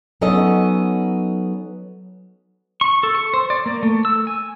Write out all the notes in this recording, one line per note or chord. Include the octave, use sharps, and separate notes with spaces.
F#3 B3 C#4 D#4 A4 D#5
C#6
A4
C#6
C5
D5
A#3
A3
E6
G#5